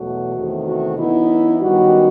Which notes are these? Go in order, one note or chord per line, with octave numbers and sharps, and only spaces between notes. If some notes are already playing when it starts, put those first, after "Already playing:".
Already playing: E2 B2 F#3 A3 F#4
E2 C3 D#3 A3
F#4
F#2 E3 B3 D#4 E4
F#2 D#3 G3 B3 D#4 F#4